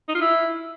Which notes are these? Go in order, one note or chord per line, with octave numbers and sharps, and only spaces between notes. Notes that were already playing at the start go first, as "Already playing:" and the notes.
D#4
F4
E4